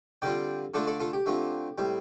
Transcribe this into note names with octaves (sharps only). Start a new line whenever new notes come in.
D3 G3 C4 F4 D5 G5
D3 A3 D4 F4 A4 D5
A4 D5
F4 A4
G4
D3 A3 C4 F4
A2 G3 C4